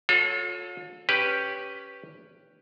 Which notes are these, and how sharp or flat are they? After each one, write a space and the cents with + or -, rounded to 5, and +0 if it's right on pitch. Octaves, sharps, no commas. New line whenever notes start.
F4 +40 A4 -5 C#5 +0
C#4 +0 G4 +0 B4 +0